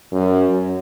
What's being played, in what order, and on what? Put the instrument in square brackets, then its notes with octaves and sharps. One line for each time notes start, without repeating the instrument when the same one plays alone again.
[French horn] F#2